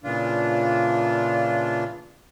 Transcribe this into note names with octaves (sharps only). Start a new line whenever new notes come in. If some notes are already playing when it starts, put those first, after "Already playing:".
A#2 C#3 E3 D4 F4